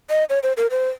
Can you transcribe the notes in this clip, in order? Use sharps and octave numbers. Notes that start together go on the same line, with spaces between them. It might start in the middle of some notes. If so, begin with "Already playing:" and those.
D#5
C#5
C5
A#4
C5